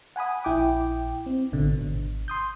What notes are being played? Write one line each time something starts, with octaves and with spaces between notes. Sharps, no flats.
F#5 G#5 B5 D#6
A#1 E4 G5 D6
C4
A1 B2 D3
G#1
C6 D#6 G6